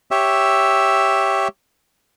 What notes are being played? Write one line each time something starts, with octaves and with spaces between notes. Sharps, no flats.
G4 C#5 E5 E6